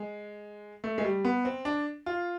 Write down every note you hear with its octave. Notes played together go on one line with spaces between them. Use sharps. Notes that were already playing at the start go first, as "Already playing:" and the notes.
Already playing: G#3
A3
G#3
G3
B3
C4
D4
F4